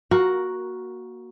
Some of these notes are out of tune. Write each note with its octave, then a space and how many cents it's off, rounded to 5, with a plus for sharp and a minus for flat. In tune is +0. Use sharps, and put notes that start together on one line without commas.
A#3 +15 F#4 +0 A#4 +0